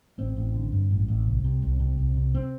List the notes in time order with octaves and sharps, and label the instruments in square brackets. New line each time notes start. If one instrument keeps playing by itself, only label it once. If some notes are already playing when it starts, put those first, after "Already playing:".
[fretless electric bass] A1 C4
A1
D3
G2
A1
A1
C2
C3
C2
C3
C2
C3
C4